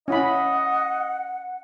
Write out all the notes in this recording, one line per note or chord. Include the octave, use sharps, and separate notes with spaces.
C#4 E4 D#5 F#5 B5